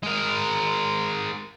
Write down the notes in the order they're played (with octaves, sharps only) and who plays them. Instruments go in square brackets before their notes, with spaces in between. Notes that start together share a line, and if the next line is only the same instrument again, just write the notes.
[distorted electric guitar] G#3 A#4